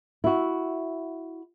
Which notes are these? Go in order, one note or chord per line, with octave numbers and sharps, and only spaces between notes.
E4 F#4